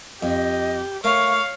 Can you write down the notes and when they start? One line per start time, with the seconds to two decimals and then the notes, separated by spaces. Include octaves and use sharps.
0.23 F2 G4 D#5
1.04 A3 A#4 C#5 F5 C#6